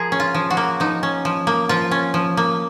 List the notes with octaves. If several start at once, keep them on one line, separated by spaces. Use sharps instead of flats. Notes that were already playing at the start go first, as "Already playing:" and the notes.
Already playing: F3 G#4 A#4
C#4
F4
F3
F#4
A#3
F3 D#4
C#4
F3
A#3
F3 F4
C#4
F3
A#3